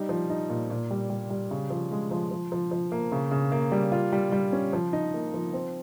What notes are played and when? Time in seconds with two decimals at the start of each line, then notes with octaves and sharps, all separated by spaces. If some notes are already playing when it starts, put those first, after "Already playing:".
Already playing: G3 D#4
0.09 F3
0.30 D#4
0.49 A#2
0.70 A#2
0.91 G3
1.10 G3
1.30 G3
1.51 C#3
1.70 F3
1.92 G#3
2.11 F3
2.31 F3
2.52 F3
2.71 F3
2.92 A#3
3.12 C#3
3.31 C#3
3.52 A#3
3.72 G3
3.92 F4
4.12 G3
4.32 G3
4.53 C#4
4.73 F3
4.93 D#4
5.14 A#3
5.34 F3
5.53 C4